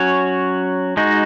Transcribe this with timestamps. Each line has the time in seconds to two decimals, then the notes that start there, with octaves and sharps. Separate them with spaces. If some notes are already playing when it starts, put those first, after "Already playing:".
Already playing: F#3 C#4 F#4 C#5
0.97 G#3 D#4 F#4